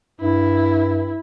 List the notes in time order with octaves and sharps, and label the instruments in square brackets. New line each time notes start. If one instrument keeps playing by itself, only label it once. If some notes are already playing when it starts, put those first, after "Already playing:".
[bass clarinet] G2 [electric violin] E4